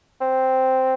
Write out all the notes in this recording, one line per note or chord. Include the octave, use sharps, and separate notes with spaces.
C4